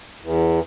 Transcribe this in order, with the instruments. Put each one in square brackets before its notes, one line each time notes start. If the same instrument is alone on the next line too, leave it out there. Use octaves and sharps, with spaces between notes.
[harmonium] E2